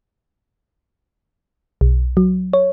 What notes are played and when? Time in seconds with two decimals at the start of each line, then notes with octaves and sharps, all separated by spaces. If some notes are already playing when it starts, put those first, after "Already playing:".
1.81 B1
2.17 F#3
2.53 C#5